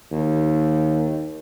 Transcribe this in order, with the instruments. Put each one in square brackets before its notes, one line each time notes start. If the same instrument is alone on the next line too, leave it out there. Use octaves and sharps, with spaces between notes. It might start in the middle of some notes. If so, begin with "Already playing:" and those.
[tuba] D#2